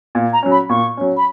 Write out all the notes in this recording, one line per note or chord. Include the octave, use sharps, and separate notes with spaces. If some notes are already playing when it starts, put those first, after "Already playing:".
A#2
A#5
F#3 C#4
B5
A#2 C#6
F#3 C#4
B5